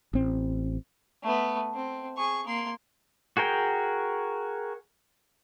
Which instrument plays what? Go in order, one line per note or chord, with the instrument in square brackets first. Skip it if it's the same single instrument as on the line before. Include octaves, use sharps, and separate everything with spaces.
[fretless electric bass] A1 C4
[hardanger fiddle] A3 B3
C4
G#4 C#6
A#3 C6
[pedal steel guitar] F#4 G#4 A#4 G5